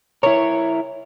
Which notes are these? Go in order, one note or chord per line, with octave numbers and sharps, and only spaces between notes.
E4 A#4 C#5